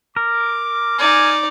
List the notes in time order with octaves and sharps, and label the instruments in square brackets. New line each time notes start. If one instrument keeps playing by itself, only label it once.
[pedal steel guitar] A#4 [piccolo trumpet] D6
[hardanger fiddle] D#4 D5 [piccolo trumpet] G#5